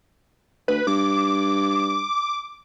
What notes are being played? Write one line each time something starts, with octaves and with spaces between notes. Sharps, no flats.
D2 B4
G2 D6